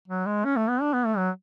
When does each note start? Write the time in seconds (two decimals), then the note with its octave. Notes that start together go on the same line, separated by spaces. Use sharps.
0.08 F#3
0.26 G#3
0.45 C#4
0.57 A3
0.69 B3
0.81 D4
0.93 B3
1.06 A3
1.18 F#3